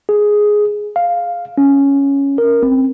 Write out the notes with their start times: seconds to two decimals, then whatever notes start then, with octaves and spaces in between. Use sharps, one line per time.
0.09 G#4
0.96 F5
1.58 C#4
2.38 A#4
2.63 C4